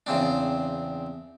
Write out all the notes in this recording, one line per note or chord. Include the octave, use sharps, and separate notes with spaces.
E2 C#3 C4 D4